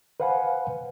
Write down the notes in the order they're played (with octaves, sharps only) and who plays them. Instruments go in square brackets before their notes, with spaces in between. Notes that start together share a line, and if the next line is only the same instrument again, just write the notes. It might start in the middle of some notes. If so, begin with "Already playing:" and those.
[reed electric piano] B4 C5 F5 F#5 G#5 B5